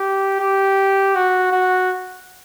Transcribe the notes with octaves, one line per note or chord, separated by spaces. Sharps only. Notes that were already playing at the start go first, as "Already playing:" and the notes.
Already playing: G4
G4
F#4
F#4